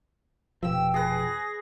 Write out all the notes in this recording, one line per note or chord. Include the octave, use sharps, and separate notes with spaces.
F1 B2 F3 G4 G5 E6
G#4 B4 A#6